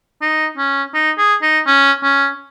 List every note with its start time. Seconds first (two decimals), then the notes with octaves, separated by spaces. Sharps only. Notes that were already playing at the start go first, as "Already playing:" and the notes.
0.21 D#4
0.57 C#4
0.94 D#4
1.18 G#4
1.42 D#4
1.67 C#4
2.03 C#4